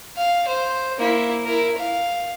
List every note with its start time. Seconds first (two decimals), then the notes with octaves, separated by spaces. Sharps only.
0.16 F5
0.48 C5
0.99 A#3 E4
1.45 E4 A#4
1.78 F5